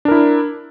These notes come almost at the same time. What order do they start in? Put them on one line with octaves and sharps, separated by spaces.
D4 A#4 E4